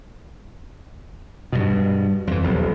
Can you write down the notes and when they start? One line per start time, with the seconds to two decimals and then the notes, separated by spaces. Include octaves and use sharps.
1.52 G2 B2
2.27 F2 E3
2.42 D#1 B1 F3